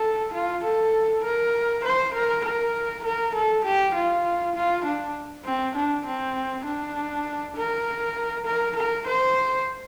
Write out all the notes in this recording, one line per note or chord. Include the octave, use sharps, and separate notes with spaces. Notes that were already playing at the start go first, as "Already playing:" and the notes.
Already playing: A4
F4
A4
A#4
C5
A#4
A#4
A#4
A4
G4
F4
F4
D4
C4
D4
C4
D4
A#4
A#4
A#4
C5